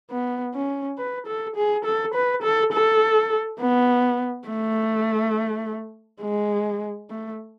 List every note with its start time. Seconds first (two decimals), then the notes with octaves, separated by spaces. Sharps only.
0.10 B3
0.55 C#4
0.98 B4
1.27 A4
1.56 G#4
1.85 A4
2.14 B4
2.43 A4
2.73 A4
3.60 B3
4.48 A3
6.22 G#3
7.10 A3